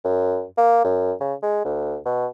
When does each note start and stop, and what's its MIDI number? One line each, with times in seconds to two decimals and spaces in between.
0.04 0.44 42
0.57 0.83 58
0.84 1.13 42
1.20 1.34 49
1.43 1.61 56
1.65 1.98 38
2.06 2.26 47